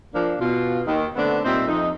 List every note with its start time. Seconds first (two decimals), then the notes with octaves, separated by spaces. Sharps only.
0.15 F3 A#3 D4
0.40 B2 F4
0.86 D#2 D#3
1.16 D3 A3 B3 C4 D4
1.45 A#2 G3 C4 D#4 C5 E5
1.68 F2 D#4